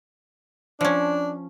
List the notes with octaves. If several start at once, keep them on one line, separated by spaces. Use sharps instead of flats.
F3 C#4 D4